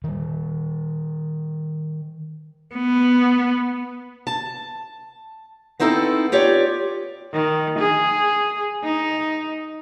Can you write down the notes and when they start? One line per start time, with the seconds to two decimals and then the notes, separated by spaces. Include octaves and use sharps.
0.04 D#3 G3
2.76 B3
4.27 A5
5.80 B3 C4 D#4 E4 G4 A4
6.32 F4 G4 C#5 D5
7.33 D#3
7.79 G#4
8.84 D#4